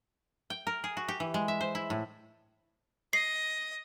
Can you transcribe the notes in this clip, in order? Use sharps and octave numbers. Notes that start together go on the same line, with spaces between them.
G5
A#4
G#4
F#4
G4
E3
G#3
E5
C5
E4
A2
D#5 C7